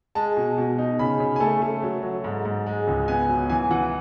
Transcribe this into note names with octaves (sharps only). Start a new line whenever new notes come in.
G#3 A5
B2
B2
D#4
C#3 B5
C#3
G#5
A3 A5
A3
F#3
F#3
G#2
G#2
G#3
C#2
B3 G#5
F#3
E3 G#5
E3 F#5